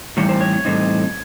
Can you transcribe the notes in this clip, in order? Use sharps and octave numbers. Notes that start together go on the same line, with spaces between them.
A2 E3 G3 C4 D#4 C#5
C5
C#5
A2 E3 G3 C4 D#4